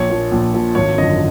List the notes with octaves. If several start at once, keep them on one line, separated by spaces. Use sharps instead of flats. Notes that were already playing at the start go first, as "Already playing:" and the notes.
Already playing: A#1 C#5
A#2 F3
A#1
A#2 F3
G#1 C#5
F#2 D3 F3 D#5